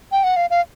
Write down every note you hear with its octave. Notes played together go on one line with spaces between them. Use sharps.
G5
F#5
F5
F5